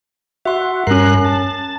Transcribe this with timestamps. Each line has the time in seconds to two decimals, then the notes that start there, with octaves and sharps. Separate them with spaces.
0.45 F#4 E5 C6
0.87 G2 C#4 A#4 F#6 C7
1.25 A5